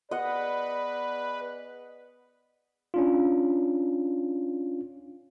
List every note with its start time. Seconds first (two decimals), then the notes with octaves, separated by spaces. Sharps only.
0.11 B3 G#4 B4 D5 D#5 F#5
2.94 C#4 D4 F4